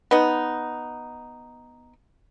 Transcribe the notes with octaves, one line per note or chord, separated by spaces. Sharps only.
B3 D#4